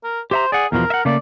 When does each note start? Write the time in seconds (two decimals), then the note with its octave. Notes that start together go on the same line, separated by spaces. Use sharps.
0.04 A#4
0.31 G4 C5 E5 A#5
0.52 G#4 D5 F#5
0.72 E2 B2 F3 A#4
0.90 E5 F#5
1.05 C#3 A3 A#3 D5